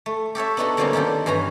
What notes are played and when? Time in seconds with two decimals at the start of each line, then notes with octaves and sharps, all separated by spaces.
0.06 A3
0.35 G4 A4 C#5 E5
0.57 B3 D4 D#4 F#4 A4
0.77 D3 F#3 G3 A#3 C4 C#4
0.93 D#3 D4 G4 A4 G5
1.26 G2 E3 C#4 B4 A#5